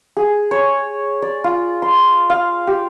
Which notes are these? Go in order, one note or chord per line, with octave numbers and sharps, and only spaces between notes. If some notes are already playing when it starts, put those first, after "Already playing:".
G#4
C#5
D5
F4
C6
F5
G4